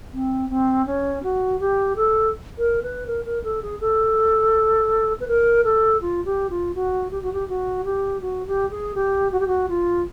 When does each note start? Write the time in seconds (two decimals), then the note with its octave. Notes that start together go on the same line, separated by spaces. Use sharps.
0.13 C4
0.50 C4
0.86 C#4
1.23 F#4
1.60 G4
1.96 A4
2.58 A#4
2.83 B4
3.07 A#4
3.25 A#4
3.44 A4
3.62 G#4
3.81 A4
5.20 B4
5.28 A#4
5.64 A4
6.01 F4
6.25 G4
6.50 F4
6.75 F#4
7.11 G4
7.23 F#4
7.33 G4
7.49 F#4
7.85 G4
8.21 F#4
8.47 G4
8.71 G#4
8.95 G4
9.32 F#4
9.40 G4
9.47 F#4
9.69 F4